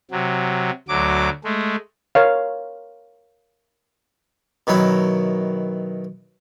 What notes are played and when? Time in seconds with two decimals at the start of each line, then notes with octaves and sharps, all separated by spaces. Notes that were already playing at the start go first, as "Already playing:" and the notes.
0.11 C3 F#3
0.88 D2 F#3 D6
1.44 G#3 A3
2.15 A#4 C#5 F5
4.67 B2 D#3 F#3 E4